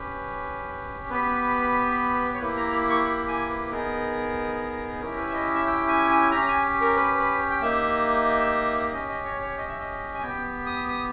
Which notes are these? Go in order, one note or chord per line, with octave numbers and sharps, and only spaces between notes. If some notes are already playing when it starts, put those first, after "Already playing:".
Already playing: C#4 G4 B4
B3 G4 B4
C#5
A#3 E4 G4 B4
A#5
B5
C#6
B5
G#5
B4
B3 D#4 G#4 A#4
C#4 E4 G4 A#4
B4
E5
D#5
E5
G5
G#5
G#5
C#4 G4 A#5
G#5
A#4
B4
B4
G5
A#3 D#4 G4 E5
C#4 G4 D#5
D#5
C#5
C#5
D#5
E5
D#5
G#5
B3 G4 G5
D#6
D#6